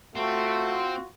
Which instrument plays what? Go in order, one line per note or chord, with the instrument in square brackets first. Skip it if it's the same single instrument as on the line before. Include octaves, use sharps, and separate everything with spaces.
[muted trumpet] A3 [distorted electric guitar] C4 [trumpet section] F4 F#4